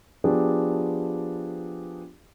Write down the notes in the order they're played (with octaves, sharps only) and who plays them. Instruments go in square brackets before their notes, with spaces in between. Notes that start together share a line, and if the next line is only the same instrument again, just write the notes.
[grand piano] F3 B3 D4 G4 G#4